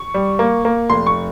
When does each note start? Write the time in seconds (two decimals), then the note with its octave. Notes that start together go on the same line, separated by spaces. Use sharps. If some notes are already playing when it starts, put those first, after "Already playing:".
Already playing: C#6
0.14 G3
0.39 A#3
0.65 A#3
0.90 F1 C6
1.07 C#6